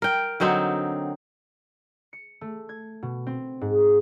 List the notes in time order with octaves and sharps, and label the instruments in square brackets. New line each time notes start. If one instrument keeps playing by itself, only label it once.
[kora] A#4 G5
D3 F#3 C4 D#4
[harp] C#7
A3
G#6
B2
C4
G#2